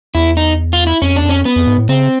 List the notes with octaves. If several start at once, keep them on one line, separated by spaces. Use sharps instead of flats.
E2 E4
D#4
F4
E4
F2 C#4
E2 D4
F2
C#4
B3
F2
G#2
A2
C#3 C4